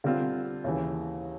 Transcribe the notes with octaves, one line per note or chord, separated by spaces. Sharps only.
D3 G3 C4 F4
D#2 C#3 E3